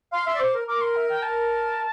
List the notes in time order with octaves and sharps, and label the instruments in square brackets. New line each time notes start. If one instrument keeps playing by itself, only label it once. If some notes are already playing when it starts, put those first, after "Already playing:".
[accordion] F5 [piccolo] C6
[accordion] E5 [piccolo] C6
[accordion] D5
[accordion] C5 [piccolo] D6
[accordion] A#4
[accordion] A#4 [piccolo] D6
[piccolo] C6
E5
G5
A5